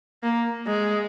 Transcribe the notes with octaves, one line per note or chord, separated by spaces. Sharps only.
A#3
G#3